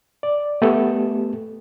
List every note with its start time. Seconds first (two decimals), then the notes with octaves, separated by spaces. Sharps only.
0.23 D5
0.62 A3 B3 G4 A4